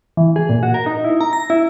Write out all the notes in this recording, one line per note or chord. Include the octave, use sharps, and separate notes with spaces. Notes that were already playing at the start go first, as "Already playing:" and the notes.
E3
G#4
A#2
F#4
A#4
D#4
E4
A#5
A#6
E4